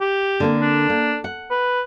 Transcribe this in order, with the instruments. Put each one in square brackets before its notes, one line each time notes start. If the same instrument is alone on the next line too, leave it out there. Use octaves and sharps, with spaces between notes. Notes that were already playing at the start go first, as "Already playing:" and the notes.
[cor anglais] G4
[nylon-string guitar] D3 A#3 C4
[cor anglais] D4
[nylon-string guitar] A#3
F#5
[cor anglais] B4